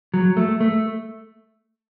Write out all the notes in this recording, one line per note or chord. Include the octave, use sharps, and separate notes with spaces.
F#3
A3
A3